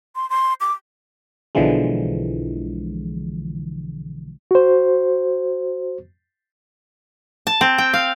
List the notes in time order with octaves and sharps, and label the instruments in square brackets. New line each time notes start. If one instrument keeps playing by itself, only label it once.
[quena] C6
C6
D6
[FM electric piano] B1 B2 D3 E3 F3 G#3
[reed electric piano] F#4 C5
[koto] A5
C4
G5
F5